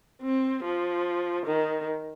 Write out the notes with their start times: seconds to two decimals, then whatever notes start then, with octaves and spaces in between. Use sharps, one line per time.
0.22 C4
0.64 F3
1.47 D#3